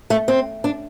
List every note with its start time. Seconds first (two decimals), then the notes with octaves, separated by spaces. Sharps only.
0.10 A3
0.28 C4
0.64 D4